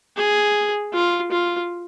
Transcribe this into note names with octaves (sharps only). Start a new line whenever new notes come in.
G#4
F4
F4